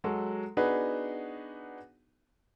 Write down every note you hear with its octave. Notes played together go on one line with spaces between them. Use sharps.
F#3 G#3 F#4 A4
B3 D4 D#4 F#4 G#4 B4